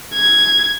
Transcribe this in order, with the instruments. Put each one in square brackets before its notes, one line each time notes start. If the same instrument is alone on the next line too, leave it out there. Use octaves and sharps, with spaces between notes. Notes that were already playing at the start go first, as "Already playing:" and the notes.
[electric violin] G#6